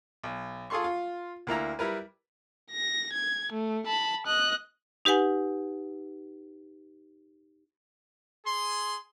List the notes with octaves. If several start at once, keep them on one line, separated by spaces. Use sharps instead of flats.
B1
F4 G#4 A4 C6 C#6
F4
D2 A#3 E4 A#5
G3 E4 A#4 B4
A#6
G#6
A3
A5 B5
D#5 F#6
D#4 G4 B4 F#5 G#5
G#4 C6